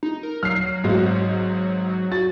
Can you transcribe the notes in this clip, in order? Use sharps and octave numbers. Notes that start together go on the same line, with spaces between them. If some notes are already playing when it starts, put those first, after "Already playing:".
D#4
A#4
F#3 F6 C7
G#1 G#2 F#4
F#4 A6